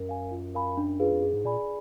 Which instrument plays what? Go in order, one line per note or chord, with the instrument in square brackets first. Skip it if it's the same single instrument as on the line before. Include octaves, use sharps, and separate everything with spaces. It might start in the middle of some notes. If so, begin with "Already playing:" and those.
Already playing: [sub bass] F#2 [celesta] A#4
[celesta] F5 G#5
F4
A#4 F5 G#5 B5
D4
F4 G#4 B4 F5
[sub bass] F2
[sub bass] F#2 [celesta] G#4
[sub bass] G#2
[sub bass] A#2 [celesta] D5 G#5 B5